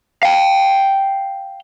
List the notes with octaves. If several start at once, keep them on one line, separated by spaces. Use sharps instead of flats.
F5 G5